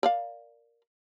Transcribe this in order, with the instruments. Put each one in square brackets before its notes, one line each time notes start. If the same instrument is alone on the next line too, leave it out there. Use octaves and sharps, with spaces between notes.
[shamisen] A#4 D5 F5